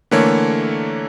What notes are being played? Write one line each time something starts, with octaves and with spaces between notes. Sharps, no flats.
D3 E3 A3 A#3 C#5